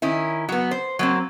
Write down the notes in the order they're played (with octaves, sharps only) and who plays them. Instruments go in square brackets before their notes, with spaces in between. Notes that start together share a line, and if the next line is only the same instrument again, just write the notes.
[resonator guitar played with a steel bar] D#3 C#4 E4
F#3 B3
C5
F#3 A#3 C4